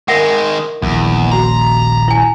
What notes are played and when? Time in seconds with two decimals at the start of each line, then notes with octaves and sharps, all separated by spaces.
0.08 D#3 G#3 A#4 E5 F#5
0.82 D#1 A#1 E2
1.32 F#4 A#5 C6
2.08 E4 G#5